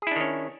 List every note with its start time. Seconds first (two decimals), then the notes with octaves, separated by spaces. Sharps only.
0.02 G#4
0.07 E4
0.11 D4
0.16 D#3
0.21 C#4